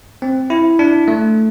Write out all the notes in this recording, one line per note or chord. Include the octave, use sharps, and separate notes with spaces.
C4
E4
D4
A3